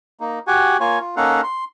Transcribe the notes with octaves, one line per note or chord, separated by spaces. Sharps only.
A#3 D#4
F#4 G4 F#5 G#5
A#3 F4 C#5 G#5
F4
A#3 C#4 D#4 A4 F5 F#5
C6